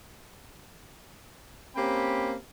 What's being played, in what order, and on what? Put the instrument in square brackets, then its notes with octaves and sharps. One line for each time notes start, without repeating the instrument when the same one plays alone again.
[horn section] A#3 C4 C#4 G4 G5 B5